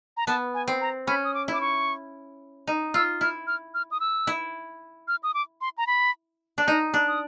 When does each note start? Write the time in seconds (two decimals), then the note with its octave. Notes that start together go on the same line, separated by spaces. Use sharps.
0.17 A#5
0.27 B3 A5
0.54 G#5
0.68 C4
0.81 A#5
1.07 C#4 B5
1.24 D#6
1.34 D6
1.48 E4
1.53 D6
1.61 C#6
2.67 D#4
2.94 F4 E6
3.21 E4 F6
3.47 F6
3.74 F6
3.91 D#6
4.00 E6
4.27 E4
5.08 F6
5.23 D#6
5.34 D6
5.61 C6
5.78 A#5
5.87 B5
6.58 D4 A5
6.67 D#4 A#5
6.94 D4
7.08 D#6